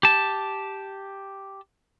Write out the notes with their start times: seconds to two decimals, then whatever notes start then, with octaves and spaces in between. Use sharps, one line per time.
0.03 G4 A5